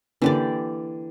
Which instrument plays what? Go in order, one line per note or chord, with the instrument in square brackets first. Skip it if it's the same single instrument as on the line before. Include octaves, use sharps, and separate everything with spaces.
[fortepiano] D3 A#3 [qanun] E3 G4 D5